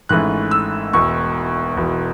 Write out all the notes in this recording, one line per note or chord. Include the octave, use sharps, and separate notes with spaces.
G#1 G#2 E3 A3 C#4 F#6
E6
E1 E2 B2 C#6
E1 E2 B2